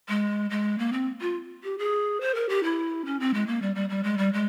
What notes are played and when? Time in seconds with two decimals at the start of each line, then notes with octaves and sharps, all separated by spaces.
0.09 G#3
0.50 G#3
0.78 A#3
0.93 C4
1.21 F4
1.64 G4
1.78 G#4
2.21 C5
2.35 A#4
2.49 G4
2.63 E4
3.05 C#4
3.20 C4
3.34 G#3
3.47 A#3
3.62 G3
3.75 G3
3.90 G3
4.04 G#3
4.18 G3
4.33 G#3